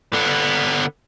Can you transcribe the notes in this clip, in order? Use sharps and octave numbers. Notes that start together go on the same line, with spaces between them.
D3 B3